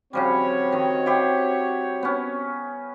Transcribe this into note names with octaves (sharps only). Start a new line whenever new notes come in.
C#3 F3 G3 C4 F#4 C#5
D#3 D#5
E4 G4 C5
B3 C#4